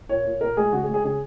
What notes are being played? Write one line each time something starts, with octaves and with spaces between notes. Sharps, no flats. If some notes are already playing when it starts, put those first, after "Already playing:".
A#2 C#5
A#2
A#2 A#4
G#3 G#4
C#3 F#4
G#4
G#3
G#4
C#3 G#4